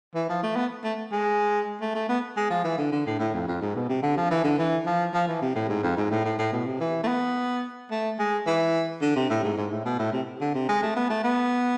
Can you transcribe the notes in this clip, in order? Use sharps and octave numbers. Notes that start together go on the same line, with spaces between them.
E3
F3
A3
B3
A3
G#3
A3
A3
B3
G#3
F3
E3
D3
D3
A2
A2
F2
F2
G#2
B2
C3
D3
F3
E3
D3
E3
F3
F3
E3
C3
A2
G#2
F2
G#2
A2
A2
A2
B2
C3
E3
A3
B3
A3
G#3
E3
D3
C3
A2
G#2
G#2
A2
B2
A2
C3
D3
C3
G#3
A3
B3
A3
B3